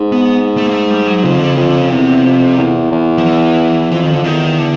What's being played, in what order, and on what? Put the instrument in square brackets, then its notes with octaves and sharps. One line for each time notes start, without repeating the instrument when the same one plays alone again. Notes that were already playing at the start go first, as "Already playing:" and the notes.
Already playing: [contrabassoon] G#2
[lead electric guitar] B3
A3
A#3
A3
G3
F#3
[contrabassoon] F2 [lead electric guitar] C#3
[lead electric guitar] D3
C#3
[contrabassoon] F2
[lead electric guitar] D3
C#3
[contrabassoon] E2 [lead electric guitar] C3
[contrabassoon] F2
E2
E2
[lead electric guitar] F3
E3
[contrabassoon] F2 [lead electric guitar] E3
[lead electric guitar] D#3
[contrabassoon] F2 [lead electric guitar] D3
[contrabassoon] E2 [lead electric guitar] D#3
[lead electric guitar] D3